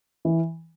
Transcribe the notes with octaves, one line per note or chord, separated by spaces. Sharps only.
E3